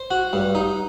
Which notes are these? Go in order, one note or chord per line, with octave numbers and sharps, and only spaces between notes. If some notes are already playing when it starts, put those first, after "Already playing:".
Already playing: C5
F#4
G2
D#4